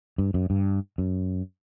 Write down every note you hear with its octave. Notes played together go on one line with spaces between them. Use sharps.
G2
F#2
G2
F#2